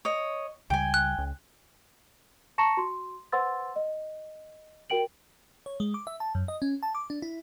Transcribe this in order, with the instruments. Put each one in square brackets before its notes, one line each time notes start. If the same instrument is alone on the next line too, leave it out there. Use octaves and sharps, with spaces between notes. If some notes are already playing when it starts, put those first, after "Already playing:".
[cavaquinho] C#5 D#5
[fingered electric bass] C#2 C#3 G3 [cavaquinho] G5 G#5
[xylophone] F#6
[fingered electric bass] C#2
[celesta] A5 A#5 C#6 A#6 C#7 E7
F#4 C6
B4 C5 F#5 C6 E6 A6
D#5
F#4 A#4 G5 D7 F#7
[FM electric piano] C#5
G#3
D6
E5
A5
F#2
D#5
C#4
A5
D6
D4
E4